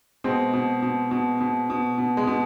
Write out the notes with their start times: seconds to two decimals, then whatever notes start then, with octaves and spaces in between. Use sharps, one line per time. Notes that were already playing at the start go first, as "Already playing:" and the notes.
0.24 B2 G#3 C4
0.53 B2
0.82 B2
1.11 B2
1.40 B2
1.70 B2
1.98 B2
2.17 G#3
2.27 B2